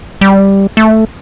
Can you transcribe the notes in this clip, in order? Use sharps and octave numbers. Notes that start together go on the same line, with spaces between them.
G3
A3